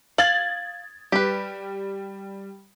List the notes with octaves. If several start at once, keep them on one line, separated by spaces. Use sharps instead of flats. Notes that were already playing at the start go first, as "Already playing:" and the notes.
F5 G#6 A6 F#7
G3 G4 B4